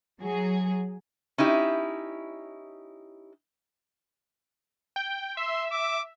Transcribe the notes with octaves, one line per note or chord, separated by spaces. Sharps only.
F#3 G#4
C#4 D#4 E4 G4
G5
E5 C6
D6